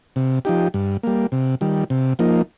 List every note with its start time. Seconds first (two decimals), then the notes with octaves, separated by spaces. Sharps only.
0.16 C3
0.45 F3 D#4 G4
0.74 G2
1.03 G3 A#3
1.32 C3
1.61 D#3 G3
1.90 C3
2.19 F3 A#3 D#4